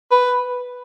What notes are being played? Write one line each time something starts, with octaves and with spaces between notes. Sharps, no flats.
B4